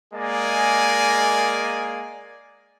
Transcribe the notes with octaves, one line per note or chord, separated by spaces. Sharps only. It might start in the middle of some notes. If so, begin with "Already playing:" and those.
G#3 A#3 D5 D#5 G#5